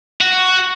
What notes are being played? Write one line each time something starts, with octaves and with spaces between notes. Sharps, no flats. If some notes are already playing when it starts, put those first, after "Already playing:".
F#4